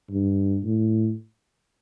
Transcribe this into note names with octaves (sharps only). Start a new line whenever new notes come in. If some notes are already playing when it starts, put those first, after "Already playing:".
G2
A2